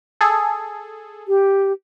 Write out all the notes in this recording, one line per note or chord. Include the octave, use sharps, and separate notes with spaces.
G#4 A4
G4